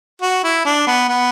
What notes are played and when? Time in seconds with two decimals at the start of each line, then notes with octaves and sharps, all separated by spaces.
0.22 F#4
0.44 E4
0.65 D4
0.87 B3
1.09 B3